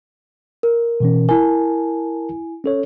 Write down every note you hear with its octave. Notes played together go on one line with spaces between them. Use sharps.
A#4
B2 E3 C#4
E4 A#4 G#5 A5
C#4 A4 C#5